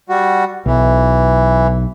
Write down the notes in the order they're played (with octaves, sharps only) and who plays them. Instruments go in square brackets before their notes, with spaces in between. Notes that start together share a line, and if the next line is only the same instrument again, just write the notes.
[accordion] G3 F#4
[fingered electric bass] B1 [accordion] E3